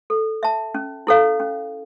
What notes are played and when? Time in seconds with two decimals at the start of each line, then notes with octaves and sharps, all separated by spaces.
0.10 A4
0.43 E5 A5
0.75 C#4
1.07 E4 A4 C#5 F5
1.40 C#4